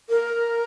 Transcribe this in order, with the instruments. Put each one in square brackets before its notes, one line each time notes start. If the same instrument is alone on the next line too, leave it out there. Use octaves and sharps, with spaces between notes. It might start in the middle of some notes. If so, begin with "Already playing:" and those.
[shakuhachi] A#4